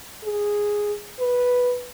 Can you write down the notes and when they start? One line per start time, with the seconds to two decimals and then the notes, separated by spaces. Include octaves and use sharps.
0.25 G#4
1.20 B4